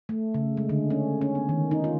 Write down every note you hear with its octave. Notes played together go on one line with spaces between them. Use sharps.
A3
C#3
G#3
D3
C#4
C#4
B3
D#3
D#4
F4